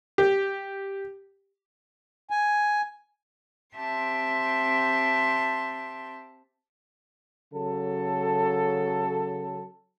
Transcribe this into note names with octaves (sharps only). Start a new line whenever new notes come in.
G4
G#5
C4 G4 E5 G5 A5 C6
C#3 F#3 A4